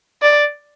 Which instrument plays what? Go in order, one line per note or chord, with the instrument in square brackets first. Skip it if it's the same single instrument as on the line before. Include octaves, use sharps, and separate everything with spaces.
[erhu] D5